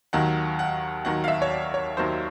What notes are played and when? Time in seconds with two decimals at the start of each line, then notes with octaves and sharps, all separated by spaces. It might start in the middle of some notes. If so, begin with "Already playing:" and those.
0.13 D#2 D#3 F#3 F#5
0.59 F#5
1.05 D#2 D#3 F#3 F#5
1.24 F5
1.28 E5
1.42 C#5
1.51 D5
1.74 C#5
1.97 D#2 D#3 F#3 C5